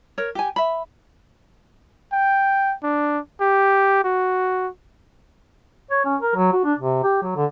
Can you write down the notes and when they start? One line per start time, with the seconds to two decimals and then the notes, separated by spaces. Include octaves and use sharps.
0.18 A#4 C#5
0.35 G4 G#5
0.56 E5 B5
2.12 G5
2.83 D4
3.41 G4
4.04 F#4
5.91 C#5
6.05 C#4
6.21 A#4
6.35 F#3
6.53 F#4
6.65 D4
6.79 C3
7.04 G4
7.23 F#3
7.36 D3